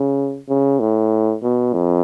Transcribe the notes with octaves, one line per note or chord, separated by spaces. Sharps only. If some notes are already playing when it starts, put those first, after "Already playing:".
Already playing: C#3
C#3
A2
B2
F2